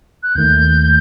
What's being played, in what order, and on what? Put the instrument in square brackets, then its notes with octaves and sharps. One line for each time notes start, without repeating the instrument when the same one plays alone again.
[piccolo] F#6
[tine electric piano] D#2 D#3 A3 [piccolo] G6